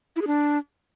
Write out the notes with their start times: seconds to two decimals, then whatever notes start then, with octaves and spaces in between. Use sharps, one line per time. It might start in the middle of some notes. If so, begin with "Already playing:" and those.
0.16 E4
0.21 G#4
0.27 D4